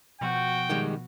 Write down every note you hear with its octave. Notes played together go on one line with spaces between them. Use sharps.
B2 F3 B3 F#4 G5
D#3 G3 G#3